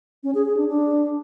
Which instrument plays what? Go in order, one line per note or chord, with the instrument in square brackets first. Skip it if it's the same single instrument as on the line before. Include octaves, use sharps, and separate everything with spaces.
[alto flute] C#4
G#4
G#4
D4
D4